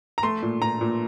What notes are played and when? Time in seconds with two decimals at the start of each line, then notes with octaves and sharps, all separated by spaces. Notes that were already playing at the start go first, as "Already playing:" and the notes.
0.18 A#5
0.23 A3 C6
0.42 A#2
0.62 A#2 A#5
0.81 A#2